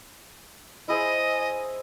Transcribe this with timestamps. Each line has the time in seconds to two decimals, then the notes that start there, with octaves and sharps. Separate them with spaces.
0.88 E4 G#4 C5 D#5